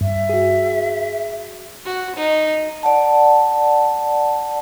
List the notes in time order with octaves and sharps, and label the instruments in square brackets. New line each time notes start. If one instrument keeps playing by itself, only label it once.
[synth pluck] G2 [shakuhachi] E5
[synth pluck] F#4 G#4
[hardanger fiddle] F#4
D#4
[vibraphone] D5 F#5 A5